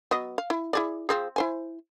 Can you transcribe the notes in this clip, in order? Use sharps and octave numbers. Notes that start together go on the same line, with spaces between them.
F#3 B3 D#5
F5
E4
E4 G#4 D5
F3 C4 G#4
E4 C5 G#5